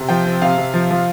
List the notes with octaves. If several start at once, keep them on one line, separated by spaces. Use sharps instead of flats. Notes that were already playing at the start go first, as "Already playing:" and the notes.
Already playing: C3
F3 G5
C4
C3 F5
C3
F3
F3